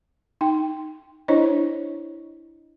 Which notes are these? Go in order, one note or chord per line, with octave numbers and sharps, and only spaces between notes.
D#4 G5
D4 E4 C5 C#5 D#5